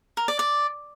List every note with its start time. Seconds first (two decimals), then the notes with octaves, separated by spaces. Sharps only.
0.17 A#4
0.28 D5
0.39 D5